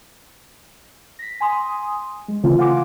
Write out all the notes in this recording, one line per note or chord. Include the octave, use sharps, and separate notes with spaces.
A#6 B6
G#5 C6 D#6
G#3
C#3 E3 A3 C4 F4
F5 F#5 G#5 C6 D6